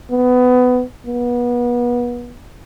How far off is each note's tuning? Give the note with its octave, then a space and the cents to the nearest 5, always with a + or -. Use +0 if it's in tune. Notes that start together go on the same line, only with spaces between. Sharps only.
B3 +20
B3 -30